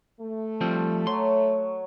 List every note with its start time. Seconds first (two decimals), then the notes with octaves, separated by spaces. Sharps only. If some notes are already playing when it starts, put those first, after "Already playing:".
0.20 A3
0.61 F3 G3 C4
1.07 F#3 C#5 C6